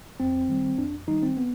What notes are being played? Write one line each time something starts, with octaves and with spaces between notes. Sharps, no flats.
F2 C4
D#3 G3
F2 D4
D#3 G3 D#4
C4
B3